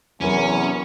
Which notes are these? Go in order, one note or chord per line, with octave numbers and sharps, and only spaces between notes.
E2 C3 F#3 C#4 A#4